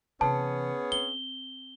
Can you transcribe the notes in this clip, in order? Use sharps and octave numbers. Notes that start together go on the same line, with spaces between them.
C3 E3 B3 C#4 G#4 A5
C4 G7